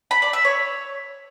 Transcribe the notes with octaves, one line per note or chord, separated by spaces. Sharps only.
B5
D5
E5
C#5